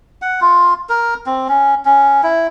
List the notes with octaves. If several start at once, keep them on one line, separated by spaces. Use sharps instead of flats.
F#5
F4
A#4
C4
C#4
C#4
E4